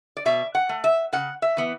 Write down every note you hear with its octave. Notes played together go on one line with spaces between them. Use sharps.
D5
B2 E5
F#5
A3
E5
C#3 F#5
E5
E3 B3